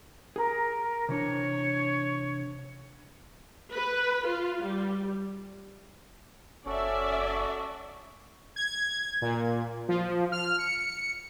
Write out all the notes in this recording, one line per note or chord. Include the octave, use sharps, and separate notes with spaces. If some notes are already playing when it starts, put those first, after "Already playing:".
G#4 A#4 A#5
C3 E3 D4 C#5
B4
F4
G3
F#1 C#4 F#4 A4 D5 E5
G#6
A#2
F3
F6
C#7